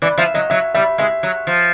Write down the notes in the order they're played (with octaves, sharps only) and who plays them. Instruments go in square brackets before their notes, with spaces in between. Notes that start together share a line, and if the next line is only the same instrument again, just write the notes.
[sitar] E3 [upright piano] D5
[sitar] F3 [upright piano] E5
[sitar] F#3 [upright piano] D#5
[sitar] F#3 [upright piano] E5
[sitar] G3 [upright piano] E5
[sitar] G#3 [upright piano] E5
[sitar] F#3
F3